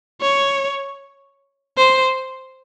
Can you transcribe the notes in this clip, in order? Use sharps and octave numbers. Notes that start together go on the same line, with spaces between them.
C#5
C5